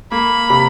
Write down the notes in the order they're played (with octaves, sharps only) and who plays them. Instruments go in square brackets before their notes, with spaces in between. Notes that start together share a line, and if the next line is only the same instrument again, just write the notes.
[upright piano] A#3 [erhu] B5
[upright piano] C3